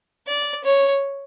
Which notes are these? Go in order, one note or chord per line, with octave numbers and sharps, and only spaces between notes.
D5
C#5